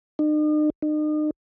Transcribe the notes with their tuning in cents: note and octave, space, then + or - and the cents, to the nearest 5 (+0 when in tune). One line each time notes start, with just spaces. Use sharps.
D#4 -45
D#4 -40